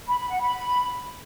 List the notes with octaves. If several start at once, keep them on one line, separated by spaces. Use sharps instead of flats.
B5
B5
F#5
B5